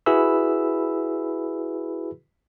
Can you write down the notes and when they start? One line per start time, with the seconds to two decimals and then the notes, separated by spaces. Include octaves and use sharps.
0.06 E4 F#4 G#4 B4 B5 E6